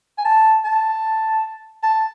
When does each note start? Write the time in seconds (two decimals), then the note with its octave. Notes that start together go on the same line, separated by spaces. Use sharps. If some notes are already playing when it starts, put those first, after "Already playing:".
0.18 G#5
0.25 A5
0.65 A5
1.83 A5